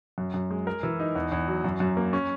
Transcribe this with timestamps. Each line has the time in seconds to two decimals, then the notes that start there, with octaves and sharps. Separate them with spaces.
0.18 F#2
0.34 F#2
0.51 G#3
0.67 A#4
0.83 E3
1.00 D#4
1.15 E2
1.32 E2
1.48 F#3
1.64 F#2
1.80 F#2
1.97 A#3
2.13 C#4